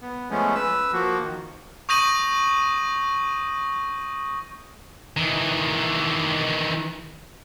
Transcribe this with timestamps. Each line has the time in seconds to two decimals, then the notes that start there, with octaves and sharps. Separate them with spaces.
0.01 B3
0.30 F3 G#3 A3 B3 C#4
0.55 B4 E6
0.93 F3 A#3 F#4
1.21 D#3
1.89 C#6 D#6 G6 A#6 D#7 F#7
5.17 D#3 E3